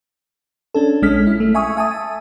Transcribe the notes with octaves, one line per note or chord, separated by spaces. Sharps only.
C#4 D4 A4
A#1 G#3 C#4 F6 B6
E4
A3
E5 G#5 C#6 D#6
E5 G#5 A5 D#6